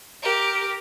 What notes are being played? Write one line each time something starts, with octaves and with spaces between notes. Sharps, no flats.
G4 A#4